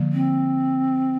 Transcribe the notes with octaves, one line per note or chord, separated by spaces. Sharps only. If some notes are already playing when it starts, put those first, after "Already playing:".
Already playing: D3 F3 A#3
C4